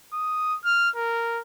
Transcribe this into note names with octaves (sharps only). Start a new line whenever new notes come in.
D#6
F6
A#4